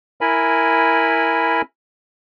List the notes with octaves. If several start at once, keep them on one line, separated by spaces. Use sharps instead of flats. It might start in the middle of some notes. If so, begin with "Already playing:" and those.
E4 A#4 G#5 B5